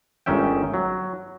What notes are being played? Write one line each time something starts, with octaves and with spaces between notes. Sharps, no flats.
G1 D#3 G#3 C#4 E5 G5
F#3